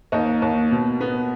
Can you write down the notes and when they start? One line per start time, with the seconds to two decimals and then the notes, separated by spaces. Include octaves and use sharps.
0.12 D#2 D#4
0.42 D#2
0.71 B2
1.00 B3